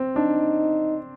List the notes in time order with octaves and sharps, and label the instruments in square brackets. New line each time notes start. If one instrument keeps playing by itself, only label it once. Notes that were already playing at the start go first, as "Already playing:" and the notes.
Already playing: [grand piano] C4
[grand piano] D4 [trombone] D#4